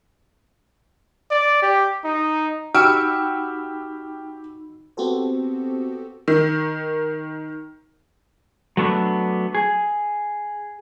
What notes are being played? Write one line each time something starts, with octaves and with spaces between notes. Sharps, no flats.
D5
G4
D#4
D#4 F#4 G4 B5 E6 F6 D7
B3 C4 F#4 G4 A4 C5
D#3
F#3 A3 B3 D4
G#4